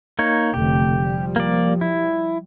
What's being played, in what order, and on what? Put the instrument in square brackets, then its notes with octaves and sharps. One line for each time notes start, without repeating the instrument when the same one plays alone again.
[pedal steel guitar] A#3 D#4 C#5
[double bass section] F1 D3 A3 [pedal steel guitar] G4
[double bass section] F3 G3
[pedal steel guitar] A#3 D5
E4